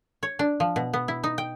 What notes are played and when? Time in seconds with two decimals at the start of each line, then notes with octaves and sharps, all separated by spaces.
0.23 C#5
0.39 D4
0.60 F3
0.76 B2
0.93 B3
1.08 E4
1.24 D#4
1.38 G5